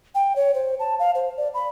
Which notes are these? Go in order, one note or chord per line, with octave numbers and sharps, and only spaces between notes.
G5
C#5
C5
A5
F5
C5
D5
B5